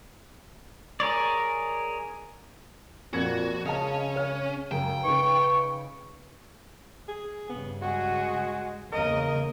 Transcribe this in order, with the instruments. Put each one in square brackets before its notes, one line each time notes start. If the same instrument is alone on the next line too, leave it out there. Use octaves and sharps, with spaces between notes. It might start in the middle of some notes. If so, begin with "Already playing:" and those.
[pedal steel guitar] G#4 A#4 C#5 D5
[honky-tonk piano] F2 G#6 [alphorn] A#2 [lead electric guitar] F#4
[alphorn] C#3 [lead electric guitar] C#4 [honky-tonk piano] D#5 F5 A5
[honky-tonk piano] C#5 F6
[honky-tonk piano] F#2 C#3 [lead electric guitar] G5
[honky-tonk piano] C#3 D#4 [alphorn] B4 [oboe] C#6
[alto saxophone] G#4
[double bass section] G2 C#3 [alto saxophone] B3
[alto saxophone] G#3 [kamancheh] F#4 G#4
[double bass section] E2 C#3 A#3 [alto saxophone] A#4 [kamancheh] D#5